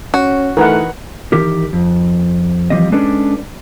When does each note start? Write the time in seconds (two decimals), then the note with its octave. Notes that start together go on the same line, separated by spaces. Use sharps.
0.14 C#4 F#4
0.57 E3 A3 D#4 A#4 B4 F#5
1.32 D#3 E3 G4 A#4
1.73 F2
2.70 E3 F3 G3 C4 D#5
2.92 G#3 C#4 D4 A4 B4 D5